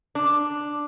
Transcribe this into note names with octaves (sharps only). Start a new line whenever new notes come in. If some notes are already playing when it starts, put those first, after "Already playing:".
D4